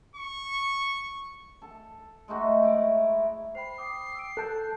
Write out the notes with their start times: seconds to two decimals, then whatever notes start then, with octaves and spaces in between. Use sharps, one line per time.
0.16 C#6
1.62 A4
2.28 G#3 A3 D#4 F#4
2.63 E4 D5
3.55 C5 G5 B5 C7
3.78 G5 D6 D#6
4.15 E6 D7
4.37 A4 A5 F#6 G6